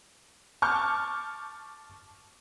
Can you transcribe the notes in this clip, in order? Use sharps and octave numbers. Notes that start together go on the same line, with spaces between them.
A5 C#6 D6 F6 G6